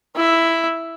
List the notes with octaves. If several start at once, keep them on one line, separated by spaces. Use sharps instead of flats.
E4 E5